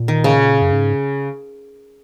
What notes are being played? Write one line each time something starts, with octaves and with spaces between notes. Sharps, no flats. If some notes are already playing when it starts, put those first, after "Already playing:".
Already playing: A#2
D#3
C#3
F#2
G#2